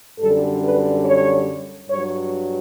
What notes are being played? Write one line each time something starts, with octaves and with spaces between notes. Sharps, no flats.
F#2 D3 G3 A4
B4
C#5
G2 F#3 C#5